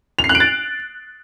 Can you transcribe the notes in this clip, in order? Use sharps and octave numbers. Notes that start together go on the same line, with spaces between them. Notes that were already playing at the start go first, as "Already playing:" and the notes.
F7
C7
F#6
D7
A6